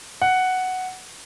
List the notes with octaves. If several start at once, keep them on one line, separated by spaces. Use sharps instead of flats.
F#5